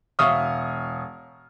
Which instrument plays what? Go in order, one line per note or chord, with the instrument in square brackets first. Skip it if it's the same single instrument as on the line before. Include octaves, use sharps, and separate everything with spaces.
[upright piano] E1 E5 F5 C#6 D#6 F6